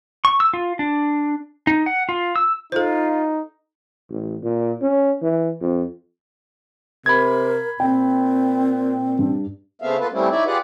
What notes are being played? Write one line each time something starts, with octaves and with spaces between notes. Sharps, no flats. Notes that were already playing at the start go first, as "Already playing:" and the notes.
C#6
E6
F4
D4
D#4
F#5
F4
E6
D#4 F4 A4 C5
A1
A#2
C#4
E3
F2
C3 A#4 B5 G#6
A#2 C4 G5
G2
C#3 A3 B3 C4 E5 F5
A#3 B3 F4 A4 B4
E3 G3 A3 C4 C#4 E4
D#4 E4 C#5 D5 E5
F4 G4 G#4 B4 D5 F#5